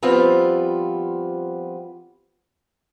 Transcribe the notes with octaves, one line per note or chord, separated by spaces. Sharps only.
F3 G3 B3 C4 F4